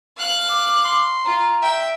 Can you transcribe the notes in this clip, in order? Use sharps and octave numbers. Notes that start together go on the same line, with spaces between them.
F5 F#6
D6
C6
F4 A#5
E5 G5